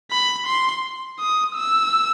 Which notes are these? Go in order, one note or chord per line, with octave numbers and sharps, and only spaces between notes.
B5
C6
D#6
E6